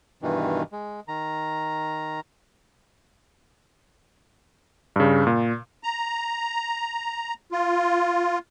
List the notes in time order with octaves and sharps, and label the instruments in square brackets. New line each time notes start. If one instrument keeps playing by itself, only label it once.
[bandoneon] G2 B2 D#3 E3
G#3
D#3 A#5
[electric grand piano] G2 C#3
A#2
[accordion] A#5
F4